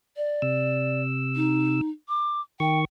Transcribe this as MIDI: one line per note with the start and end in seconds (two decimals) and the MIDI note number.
0.17 1.02 74
0.42 1.81 48
0.42 1.81 88
1.36 1.89 63
2.09 2.41 86
2.60 2.85 51
2.60 2.79 79
2.60 2.85 85